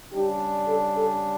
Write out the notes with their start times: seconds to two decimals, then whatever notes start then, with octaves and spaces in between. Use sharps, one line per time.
0.11 C#3 G3 D4 G4
0.67 A4
0.97 A4